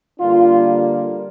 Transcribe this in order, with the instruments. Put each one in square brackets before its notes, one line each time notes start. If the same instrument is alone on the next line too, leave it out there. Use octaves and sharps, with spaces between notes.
[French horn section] D3 G3 A#3 D4 F4